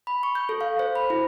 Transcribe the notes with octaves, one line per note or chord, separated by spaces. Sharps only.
B5
C#6
G6
A4
F5
C5
B5
E4